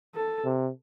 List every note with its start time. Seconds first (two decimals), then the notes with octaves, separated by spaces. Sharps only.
0.15 A4
0.44 C3